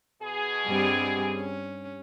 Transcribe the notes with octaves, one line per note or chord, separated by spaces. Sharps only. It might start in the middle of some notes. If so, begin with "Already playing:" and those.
B2 G#4
G2 G3 C4
C#4